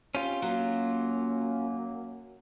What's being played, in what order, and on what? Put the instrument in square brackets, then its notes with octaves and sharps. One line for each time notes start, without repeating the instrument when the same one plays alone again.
[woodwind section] C4 [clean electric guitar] C#4 F4 [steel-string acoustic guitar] G4
[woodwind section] F#2 A#3 [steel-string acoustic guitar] F#3